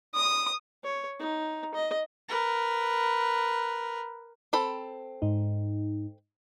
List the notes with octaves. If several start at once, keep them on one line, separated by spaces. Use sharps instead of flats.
D#6
C#5
D#4
D#5
A#4 B4
C4 A4 B5
G#2 D#4